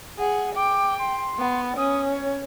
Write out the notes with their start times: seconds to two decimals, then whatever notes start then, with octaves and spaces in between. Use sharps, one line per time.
0.19 G#4 F#5
0.56 G5 D6
0.98 C6
1.39 B3
1.77 C#4 D#6
2.12 C#5